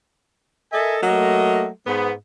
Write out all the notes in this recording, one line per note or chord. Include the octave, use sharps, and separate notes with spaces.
A4 A#4 D#5 E5 G#5
F#3 A3 A#3 D#5
G#2 G#3 B3